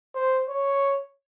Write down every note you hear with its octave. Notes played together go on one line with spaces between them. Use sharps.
C5
C#5